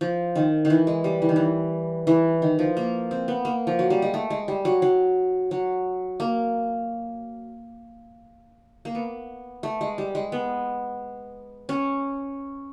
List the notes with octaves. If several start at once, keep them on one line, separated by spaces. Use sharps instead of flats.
F3
D#3
D#3
E3
G#3
G3
E3
D#3
E3
E3
D#3
F3
A#3
C4
B3
A#3
F3
F#3
G3
G#3
A3
G#3
G3
F#3
F#3
F#3
A#3
A#3
B3
A3
G#3
G3
G#3
B3
C#4